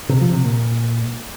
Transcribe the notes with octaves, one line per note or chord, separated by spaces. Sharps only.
C3
F3
C3
A#2